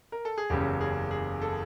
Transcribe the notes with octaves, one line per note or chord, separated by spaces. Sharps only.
A#4
A4
G#4
F#1 E2 C#3 G4
G#4
G#4
A4